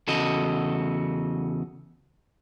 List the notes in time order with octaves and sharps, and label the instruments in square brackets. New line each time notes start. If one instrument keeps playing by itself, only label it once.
[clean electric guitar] E2 C#3 F#4 A4 D#5